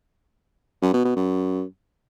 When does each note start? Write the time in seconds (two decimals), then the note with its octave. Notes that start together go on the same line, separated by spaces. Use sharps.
0.82 F#2
0.93 B2
1.05 B2
1.16 F#2